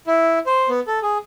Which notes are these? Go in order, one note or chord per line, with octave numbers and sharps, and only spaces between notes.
E4
C5
B3
A4
G#4